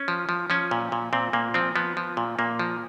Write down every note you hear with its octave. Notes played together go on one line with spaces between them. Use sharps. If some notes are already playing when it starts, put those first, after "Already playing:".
Already playing: C#4
F3
F3
F3 C#4
A#2
A#2
A#2 C4
A#2 A#3
F3 C4
F3 B3
F3
A#2
A#2 A#3
F3